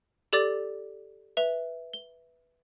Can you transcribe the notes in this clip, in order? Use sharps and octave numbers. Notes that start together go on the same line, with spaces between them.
G4 A4 D5 D6 A6
B4 E5 F7
G7